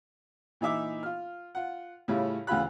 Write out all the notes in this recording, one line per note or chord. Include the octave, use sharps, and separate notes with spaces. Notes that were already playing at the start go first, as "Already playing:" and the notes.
A#2 E3 D#4 E5 D6
F4 F6
F4 F#5
A2 C#3 G3 C#4 E4 F4
D2 C#3 E3 F4 B5 F#6